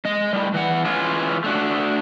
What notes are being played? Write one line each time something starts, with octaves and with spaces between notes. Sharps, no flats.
G#3 D#5
A2 G3
E3 F#5
E3 G#3 C#4 F4
A3 D4 F#4